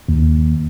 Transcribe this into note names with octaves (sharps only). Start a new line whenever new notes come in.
D#2